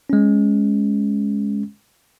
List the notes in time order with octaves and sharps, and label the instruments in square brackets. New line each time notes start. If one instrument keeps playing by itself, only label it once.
[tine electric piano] G#3 C#4